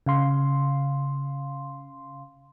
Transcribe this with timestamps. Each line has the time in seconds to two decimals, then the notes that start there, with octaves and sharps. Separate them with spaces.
0.06 C#3 F5 C6